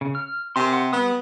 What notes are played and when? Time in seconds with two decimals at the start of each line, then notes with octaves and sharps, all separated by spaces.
0.01 C#3
0.15 F6
0.56 C3 A#4 G#5 C6
0.73 F#5 C6
0.93 G3 B3 D#6